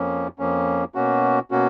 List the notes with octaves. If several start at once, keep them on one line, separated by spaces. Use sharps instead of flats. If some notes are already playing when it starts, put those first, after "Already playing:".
Already playing: F2 F3 A#3 C#4
F2 F3 A#3 C#4
B2 A#3 C#4 F#4
B2 A#3 C#4 F#4